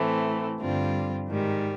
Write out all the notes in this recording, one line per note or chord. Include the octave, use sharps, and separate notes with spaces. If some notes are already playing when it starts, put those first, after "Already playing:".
Already playing: A2 E3 A3 C4
G2 D3 G3 C4 F4
G#2 D#3 G3